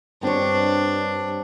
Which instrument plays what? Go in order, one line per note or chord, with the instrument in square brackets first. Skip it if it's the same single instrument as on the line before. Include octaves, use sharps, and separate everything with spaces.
[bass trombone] G2 [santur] C4 C#5 [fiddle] D4